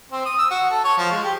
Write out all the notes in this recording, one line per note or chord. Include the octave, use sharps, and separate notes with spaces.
C4
D#6
E6
F#4
A4
C#5
F3
G#3
G4